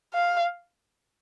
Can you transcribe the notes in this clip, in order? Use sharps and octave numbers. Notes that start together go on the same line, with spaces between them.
F5